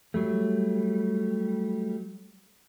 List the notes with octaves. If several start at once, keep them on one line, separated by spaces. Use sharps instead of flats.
F#3 G3 A3